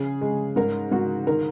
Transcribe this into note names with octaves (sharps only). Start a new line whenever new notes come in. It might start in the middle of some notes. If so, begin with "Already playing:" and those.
Already playing: C#3 G#4
G#3
G#2 A#4
G#2 F#4
D#3 A#4